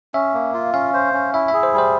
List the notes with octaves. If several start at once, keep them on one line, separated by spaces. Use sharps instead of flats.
C#4 E5
A#3
F4
C#4 F5
C5
C#4
E4 E5
E5
G#4
C5
G3 C5